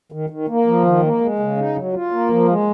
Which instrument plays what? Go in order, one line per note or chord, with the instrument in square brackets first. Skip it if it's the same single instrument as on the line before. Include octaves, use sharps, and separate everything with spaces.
[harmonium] D#3
D#3
A#3
F3
D#3
A#3
G#3
C#3
D#4
F#3
F4
A#3
F3
G#3